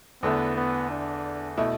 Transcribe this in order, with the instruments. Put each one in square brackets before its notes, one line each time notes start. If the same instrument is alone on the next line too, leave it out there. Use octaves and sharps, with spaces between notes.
[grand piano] E2 D3 A3 E4 [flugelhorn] B3
[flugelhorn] B3
D4
[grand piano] B2 A3 E4